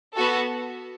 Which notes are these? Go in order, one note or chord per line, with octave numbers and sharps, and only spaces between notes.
B3 F#4 A4